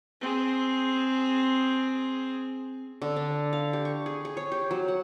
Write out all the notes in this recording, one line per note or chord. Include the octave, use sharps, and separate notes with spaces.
C4 G#4
D3
D4
F5
G4
C#6
G#4
G#4
C#5
G4
F#3
F#5